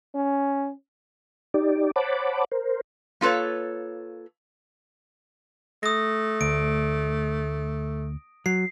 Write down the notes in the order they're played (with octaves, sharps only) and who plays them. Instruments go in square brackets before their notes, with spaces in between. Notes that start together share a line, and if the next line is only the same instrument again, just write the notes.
[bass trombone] C#4
[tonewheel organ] D#4 G4 D5
C5 C#5 F#5 A5 B5 D6
A#4 C5
[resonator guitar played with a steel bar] A#3 F4 A4 B4 C#5
[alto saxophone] A3 [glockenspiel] D#6 A#6
[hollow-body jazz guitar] D2 [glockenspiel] D7
[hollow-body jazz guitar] F#3 [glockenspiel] C7